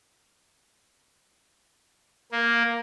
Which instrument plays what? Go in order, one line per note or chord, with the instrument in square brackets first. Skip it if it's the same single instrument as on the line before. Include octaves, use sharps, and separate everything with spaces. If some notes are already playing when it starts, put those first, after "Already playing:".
[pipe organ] A#3